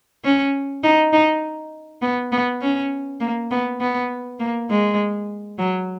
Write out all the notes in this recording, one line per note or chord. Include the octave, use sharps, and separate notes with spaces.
C#4
D#4
D#4
B3
B3
C#4
A#3
B3
B3
A#3
G#3
F#3